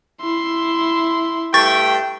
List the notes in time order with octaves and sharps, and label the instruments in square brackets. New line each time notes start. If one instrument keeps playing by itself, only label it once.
[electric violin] E4 C6
[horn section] G2 A3 G5 [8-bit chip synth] C#6 A6